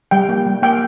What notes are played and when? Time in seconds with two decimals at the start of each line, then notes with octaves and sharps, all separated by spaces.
0.11 G3 G5
0.29 A#3
0.46 G3
0.62 A#3 G5